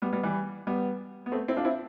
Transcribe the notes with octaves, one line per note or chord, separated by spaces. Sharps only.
G3 B3
G3 B3
E3 G3
G3 B3
B3
A3 C4
C4 E4
D4 F4
C4 E4